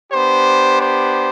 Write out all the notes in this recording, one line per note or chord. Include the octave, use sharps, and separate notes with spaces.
B3 D4 G4 C5
C5